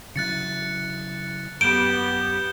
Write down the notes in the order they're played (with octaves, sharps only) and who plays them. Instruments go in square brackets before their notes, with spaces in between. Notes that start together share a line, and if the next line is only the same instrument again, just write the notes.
[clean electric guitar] C#3 F#3 E4 [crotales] F#6 A6 C#7
[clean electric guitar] F#2 [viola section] B3 G4 [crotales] G6 E7 G7 [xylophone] D7